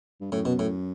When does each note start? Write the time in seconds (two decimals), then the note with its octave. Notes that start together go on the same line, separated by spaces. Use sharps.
0.21 G2
0.32 F#2 A2
0.45 B2
0.59 A2